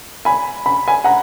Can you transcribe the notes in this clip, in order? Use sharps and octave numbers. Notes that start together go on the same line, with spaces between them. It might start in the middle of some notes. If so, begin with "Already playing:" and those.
G#5 B5
B5
G#5 B5
F#5 A#5